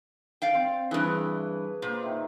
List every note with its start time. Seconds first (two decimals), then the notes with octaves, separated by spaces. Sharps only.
0.42 D5 F5 G5
0.55 C4
0.91 G2 E3 G#4 B4
1.82 A#2 C5
2.03 D#3 E5